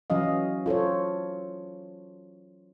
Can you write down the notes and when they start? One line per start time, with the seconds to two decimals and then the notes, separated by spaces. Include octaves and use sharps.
0.10 E3 F#3 C#4 D#5 F5
0.66 F4 A4 C5 C#5